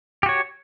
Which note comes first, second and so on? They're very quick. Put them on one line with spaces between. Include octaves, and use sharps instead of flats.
G4 F#4 C#5